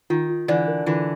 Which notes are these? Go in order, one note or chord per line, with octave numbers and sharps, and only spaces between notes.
D#3 F4
F4
D3 E3 D5
A#4
D3 E3 F4